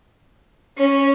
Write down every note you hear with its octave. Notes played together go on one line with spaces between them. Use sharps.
C#4